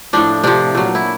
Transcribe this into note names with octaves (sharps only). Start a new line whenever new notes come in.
A2 F3 D4
C3 F3 D4
A#2 F#3
E4